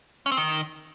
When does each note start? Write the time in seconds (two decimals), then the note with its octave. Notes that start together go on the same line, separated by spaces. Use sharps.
0.26 C#4
0.32 C4
0.37 D#3